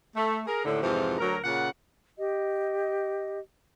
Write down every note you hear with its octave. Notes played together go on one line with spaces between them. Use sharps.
A3
G#4 A#4
D#2 A2 D3
F2 G#2 C3 E3 F4
D2 F#3 A#4
A#2 C#3 F#5
G4 D#5